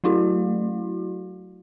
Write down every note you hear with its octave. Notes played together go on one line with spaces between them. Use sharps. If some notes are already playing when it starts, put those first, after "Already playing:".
F#3 A3 E4 F#4